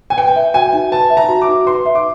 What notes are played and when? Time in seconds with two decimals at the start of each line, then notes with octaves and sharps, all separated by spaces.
0.10 G#5
0.17 B4 G5
0.36 E5
0.54 F#4 G#5
0.73 D#4
0.92 B4 A5
1.10 E5
1.17 A#5
1.29 F#4
1.42 D6
1.47 D#4
1.66 B4 C6
1.86 E5
1.95 D6